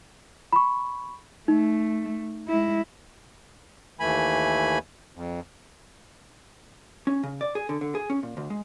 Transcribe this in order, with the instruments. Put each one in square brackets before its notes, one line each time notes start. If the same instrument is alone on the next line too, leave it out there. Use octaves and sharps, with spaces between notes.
[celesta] B5 C#6
[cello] A3 [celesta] D#4
[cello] G#3 E4
[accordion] D#2 E3 A3 G#5 B5
F2
[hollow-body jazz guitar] C#4
C#3
D5
G#4
D3
D3
G#4
C#4
A#2
D2
G#3